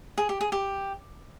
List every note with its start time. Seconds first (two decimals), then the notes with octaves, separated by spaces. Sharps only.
0.18 G#4
0.29 G4
0.41 G#4
0.52 G4